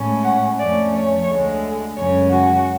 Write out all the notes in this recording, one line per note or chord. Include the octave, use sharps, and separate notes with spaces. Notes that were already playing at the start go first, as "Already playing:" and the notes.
Already playing: A2 G#3 C#4
F#5
F2 F3 A3 C#4 D5
C#5
D2 D3 G#3
F#2 C#3 G#3 C#4 C#5
F#4